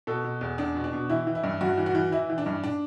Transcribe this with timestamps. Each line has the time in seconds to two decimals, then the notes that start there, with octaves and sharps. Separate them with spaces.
0.07 B2 A4
0.24 B2
0.41 E2
0.58 E2 D4
0.75 B2
0.84 D4
0.93 B2
1.09 E3 E4
1.27 E3
1.35 E4
1.44 G2
1.61 G2 F#4
1.78 E3
1.86 F#4
1.95 E3
2.12 E3 E4
2.30 E3
2.38 D4
2.46 G2
2.64 D4